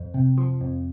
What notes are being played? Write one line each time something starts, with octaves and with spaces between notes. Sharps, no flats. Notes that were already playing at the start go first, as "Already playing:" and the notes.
Already playing: F2
C3
F3
F2